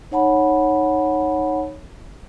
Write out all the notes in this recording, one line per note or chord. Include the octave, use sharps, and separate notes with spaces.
D#4 C#5 F#5 A5 B5